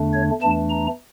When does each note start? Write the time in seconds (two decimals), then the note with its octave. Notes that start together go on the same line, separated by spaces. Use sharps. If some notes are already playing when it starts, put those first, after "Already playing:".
Already playing: E2 D3 A3 D4
0.14 C#5
0.42 E2 E3 A3 D4 A5
0.70 A#5